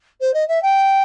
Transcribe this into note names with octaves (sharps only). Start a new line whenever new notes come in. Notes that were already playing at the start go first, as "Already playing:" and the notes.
C5
D#5
E5
G5